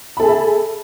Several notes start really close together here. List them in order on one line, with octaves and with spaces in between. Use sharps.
B5 A4 G#4 A5 E5